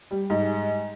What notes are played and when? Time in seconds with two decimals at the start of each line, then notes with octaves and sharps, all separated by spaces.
0.11 G3
0.30 G#2